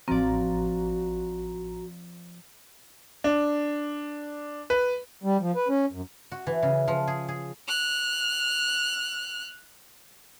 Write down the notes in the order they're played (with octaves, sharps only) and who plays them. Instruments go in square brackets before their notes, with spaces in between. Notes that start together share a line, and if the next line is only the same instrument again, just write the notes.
[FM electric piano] A1 A#5 [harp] F3 D5 [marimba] C4 [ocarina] F#4
[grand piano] D4
B4
[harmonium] G3
F3
B4
C#4
F#2
[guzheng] F#4
E3
C#3
F3
G#4
G#4
[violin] F6 F#6